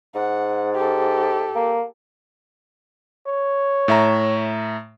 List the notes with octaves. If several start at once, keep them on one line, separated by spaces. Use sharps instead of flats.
G#2 F#5
G4 A4
A#3
C#5
A2 E5 A#5